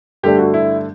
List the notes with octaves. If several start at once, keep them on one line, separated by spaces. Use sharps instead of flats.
G2 D3 A3 D4 G4
F#4
E4